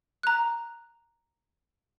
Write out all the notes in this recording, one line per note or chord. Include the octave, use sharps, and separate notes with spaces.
A#5 F#6